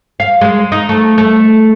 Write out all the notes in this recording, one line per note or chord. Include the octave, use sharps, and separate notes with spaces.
F5
G#3
D#4
A3
A3